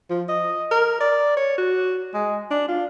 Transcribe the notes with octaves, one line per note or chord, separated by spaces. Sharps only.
F3
D#5
A#4
D5
C#5
F#4
G#3
D4
F4